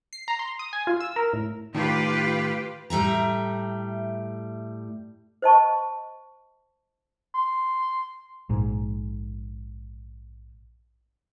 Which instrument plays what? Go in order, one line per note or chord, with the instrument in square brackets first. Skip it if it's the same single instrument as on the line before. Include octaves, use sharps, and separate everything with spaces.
[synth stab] C7
A#5
C6
D#6
G#5
F4
E6
A#4
A2
[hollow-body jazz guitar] A2 D#3 [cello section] F4 G4 B4
[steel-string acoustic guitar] A2 G3 E5 A#5
[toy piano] C5 D#5 A5 C#6
[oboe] C6
[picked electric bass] A#1 G#2